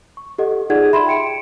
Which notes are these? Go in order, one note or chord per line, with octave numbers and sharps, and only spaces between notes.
C#6
G4 A4 D#5 F#5
D#4 F4 G#4 D5 F#5 G#6
E5 B5 C6 E7
G5 C6 C#7 D7